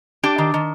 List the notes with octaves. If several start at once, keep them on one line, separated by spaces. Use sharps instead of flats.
D4 G4
D#3
D#3